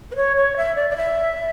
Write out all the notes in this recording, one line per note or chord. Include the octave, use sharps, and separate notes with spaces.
B4
C#5
C#5
E5
D5
D5
E5